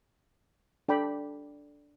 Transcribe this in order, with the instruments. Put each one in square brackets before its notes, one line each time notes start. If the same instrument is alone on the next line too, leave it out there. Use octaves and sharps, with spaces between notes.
[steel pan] D4 A4 D5 G5 B5